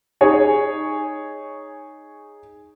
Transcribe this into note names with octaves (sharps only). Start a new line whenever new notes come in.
D#4 G#4 C#5 G#5